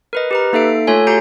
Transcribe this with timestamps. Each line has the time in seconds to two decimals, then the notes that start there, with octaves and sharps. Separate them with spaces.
0.13 A#4 B4 D#5
0.31 G4 B4 A#5
0.53 A#3 D#4 A4 E5 C7 D7
0.87 A3 F4 A4 C#5 G#5
1.07 F#4 G4 A#5 G6 D7